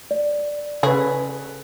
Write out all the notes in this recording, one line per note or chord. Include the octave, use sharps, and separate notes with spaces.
D5
C#3 G#4 A4 B4